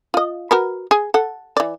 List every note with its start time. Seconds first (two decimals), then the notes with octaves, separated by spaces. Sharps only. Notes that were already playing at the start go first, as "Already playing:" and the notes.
0.14 F4 D#5
0.51 F#4 A#4 B4
0.91 G#4
1.14 A4 F#5
1.57 E3 D5